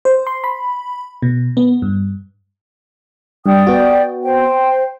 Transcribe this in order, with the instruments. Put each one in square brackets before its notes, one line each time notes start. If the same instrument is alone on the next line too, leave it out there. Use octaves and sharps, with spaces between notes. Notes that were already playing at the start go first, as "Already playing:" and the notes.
[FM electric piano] C5
C6
B5
B2
B3
G2
[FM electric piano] G2 [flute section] D5 G5 D#6
[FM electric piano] B3 F#4
[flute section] C5 G5